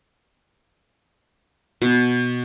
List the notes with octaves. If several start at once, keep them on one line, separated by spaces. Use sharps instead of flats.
B2